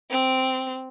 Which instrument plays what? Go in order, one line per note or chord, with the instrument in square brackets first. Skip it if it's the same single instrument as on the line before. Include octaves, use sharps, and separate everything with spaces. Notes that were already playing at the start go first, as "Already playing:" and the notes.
[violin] C4